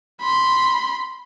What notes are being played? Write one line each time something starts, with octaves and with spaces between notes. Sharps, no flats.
B5 C6